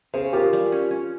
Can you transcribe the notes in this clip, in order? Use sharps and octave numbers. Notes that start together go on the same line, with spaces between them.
C#3 G#4 C5
F4 G4 A#4
G3
C#4
C#4